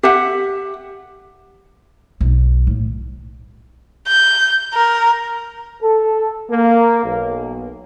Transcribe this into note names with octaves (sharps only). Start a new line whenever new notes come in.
G4 E5 F#5
B1
A2
G6
A#4
A4
A#3
B1